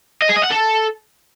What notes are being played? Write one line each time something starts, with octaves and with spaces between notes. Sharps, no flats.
D#5
G#4
D#5
F#5
A4